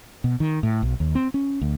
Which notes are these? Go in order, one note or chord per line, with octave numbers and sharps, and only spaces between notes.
B2
D#3
A2
B1
D#2
C4
C#4
D2